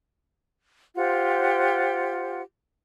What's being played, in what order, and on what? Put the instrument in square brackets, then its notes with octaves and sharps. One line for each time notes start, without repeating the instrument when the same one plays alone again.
[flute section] F4 G4 C5 F#5